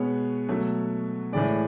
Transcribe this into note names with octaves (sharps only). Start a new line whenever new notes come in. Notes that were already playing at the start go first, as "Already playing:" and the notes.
Already playing: B2 G#3 B3 C#5
B2 F#3 A3
A2 E3 G#3 D5